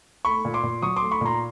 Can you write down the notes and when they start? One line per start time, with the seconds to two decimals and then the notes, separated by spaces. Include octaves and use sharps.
0.25 A3 B5 C#6
0.45 A#2
0.54 C6 D6
0.63 A#2
0.82 F#3 C#6 D#6
0.96 C6 D6
1.02 A3
1.11 B5 C#6
1.21 A#2 A#5 C6